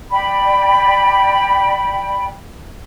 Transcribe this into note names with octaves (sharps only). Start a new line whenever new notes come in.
D5 G5 B5